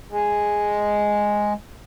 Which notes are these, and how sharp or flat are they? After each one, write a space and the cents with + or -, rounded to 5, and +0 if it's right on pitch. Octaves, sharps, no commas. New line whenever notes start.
G#3 +0